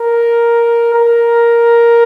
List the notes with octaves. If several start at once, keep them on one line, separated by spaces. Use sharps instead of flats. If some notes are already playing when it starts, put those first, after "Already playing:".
Already playing: A#4
A#4